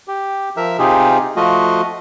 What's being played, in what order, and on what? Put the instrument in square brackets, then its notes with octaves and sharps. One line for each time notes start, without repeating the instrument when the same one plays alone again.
[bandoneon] G4
F3 A#4 E5
C3 D#4 F4 G4 G#4
F3 A3 F4 F#4 D#5